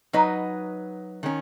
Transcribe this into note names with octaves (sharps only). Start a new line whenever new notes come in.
F#3 D#4 B4 D#5
D#3 G#3 C#4